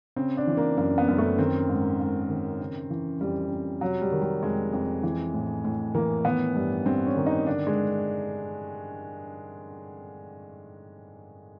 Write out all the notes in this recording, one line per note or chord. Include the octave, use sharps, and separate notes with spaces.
C#3 C4
D4
E3
A#3
F#2 A#3
B3
F#2
A3
D#3 C4
G#2
G#2
D#3
C#3
E3
F2 G3
F2
C3 F#3
G3
D#3
G3
F2 G#3
F2
E3
A2
A2
E3 A#3
D#3 B3
G2
G2 C4
C#4
D#3
D#4
D3 D4
G#3